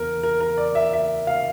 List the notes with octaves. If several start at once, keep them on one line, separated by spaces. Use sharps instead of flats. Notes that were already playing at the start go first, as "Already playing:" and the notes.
Already playing: E2 A#4
A#4
A#4
D5
E5
E5
F5